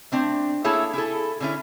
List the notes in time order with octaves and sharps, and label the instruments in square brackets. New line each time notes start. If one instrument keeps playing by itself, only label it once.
[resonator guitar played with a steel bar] A3 C4 D4
A#3 E4 G#4 A4 C#5 E5
E4 G#4 A4
D3 C#4 E4